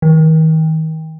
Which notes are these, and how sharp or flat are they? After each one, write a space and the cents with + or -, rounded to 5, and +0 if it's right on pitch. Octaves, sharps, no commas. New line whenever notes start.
D#3 +35